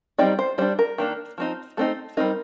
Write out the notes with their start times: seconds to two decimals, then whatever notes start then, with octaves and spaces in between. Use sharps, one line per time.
0.18 G3 C4 D#4 D5
0.39 C5
0.58 G3 D4 C5
0.79 A#4
0.98 D#3 A#3 D4
1.38 F3 C4 D#4
1.77 A3 C4 D#4 A4
2.17 G3 C4 D#4 A#4